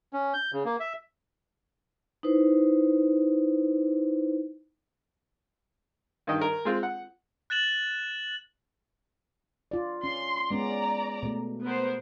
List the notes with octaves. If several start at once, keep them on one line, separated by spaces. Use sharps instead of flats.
C#4
G6
C#3
A#3
E5
D#4 E4 B4 C5
G2 D#3 D#5 G5
A#4
G#3 C4 F4
F#5
F#6 A6 E7 F#7
F4 D5
C#4 C6
G#3 B3 C#4 D5 A#5
B2 A3
B3 A#4 C5